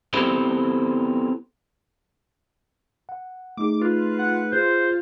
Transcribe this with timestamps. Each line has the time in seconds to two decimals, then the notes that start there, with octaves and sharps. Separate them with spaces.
0.14 B3 C4 E4 G4 A4 C5
3.09 F#5
3.57 A3 D#4 G#4 D6
3.81 F4 B4
4.19 F#5
4.52 F4 G#4 C5